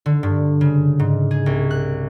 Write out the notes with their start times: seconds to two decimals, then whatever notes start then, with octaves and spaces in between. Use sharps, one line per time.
0.06 D3
0.23 G2
0.61 C#3
0.99 G#2
1.31 G#4
1.46 C2
1.71 F#6